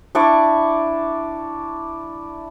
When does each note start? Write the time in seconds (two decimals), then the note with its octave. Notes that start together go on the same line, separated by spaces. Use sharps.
0.15 D4 E4 D5 C#6